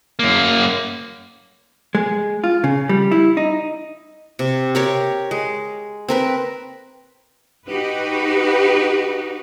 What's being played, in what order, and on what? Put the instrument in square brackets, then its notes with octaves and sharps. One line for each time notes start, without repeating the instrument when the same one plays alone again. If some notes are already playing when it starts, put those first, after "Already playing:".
[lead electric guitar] F#2 A#3
[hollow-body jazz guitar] G#3
F4
C#3
G3
E4
D#4
[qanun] C3
G4 A#4 C#5
G#3
C4 A#4 B4
[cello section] D#4 F#4 G4 B4